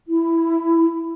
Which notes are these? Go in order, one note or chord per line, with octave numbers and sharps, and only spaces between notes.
E4